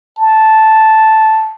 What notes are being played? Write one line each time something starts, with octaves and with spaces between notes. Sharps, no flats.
A5